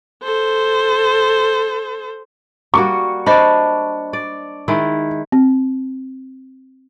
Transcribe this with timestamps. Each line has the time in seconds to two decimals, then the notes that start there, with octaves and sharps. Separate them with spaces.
0.24 A4 C5
2.74 G3 A#3 F#4 C#6
3.27 D4 C5 D5 D#5 B5
4.13 D5
4.68 D#3 G#3 E4
5.32 C4